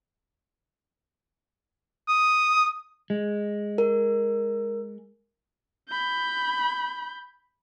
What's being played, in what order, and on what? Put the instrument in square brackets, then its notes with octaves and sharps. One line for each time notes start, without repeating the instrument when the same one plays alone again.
[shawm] D#6
[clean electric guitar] G#3
[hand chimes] A#4
[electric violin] B5 G6